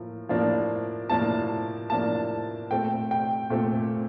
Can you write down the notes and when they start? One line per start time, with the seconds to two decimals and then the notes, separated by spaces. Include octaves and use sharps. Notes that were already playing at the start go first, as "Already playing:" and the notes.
Already playing: A2 F3 A#3
0.29 A2 F3 A#3 D4
1.09 A2 F3 A#3 D4 A5
1.90 A2 F3 A#3 D4 A5
2.71 A#2 A3 C4 G5
3.11 G5
3.50 A#2 A3 C4